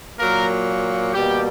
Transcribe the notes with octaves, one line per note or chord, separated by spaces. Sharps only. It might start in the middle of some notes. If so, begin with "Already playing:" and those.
A#2 F#3 A#3 A#4
B2 G3 A#3 G4